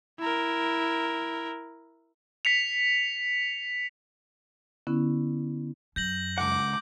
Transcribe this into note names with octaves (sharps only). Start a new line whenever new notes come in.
E4 A#4
B6 C#7 F7
D3 B3 C#4 E4
F#2 G6 A#6 F#7
C#2 F#5 D6